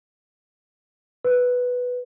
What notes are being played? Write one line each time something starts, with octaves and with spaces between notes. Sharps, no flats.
B4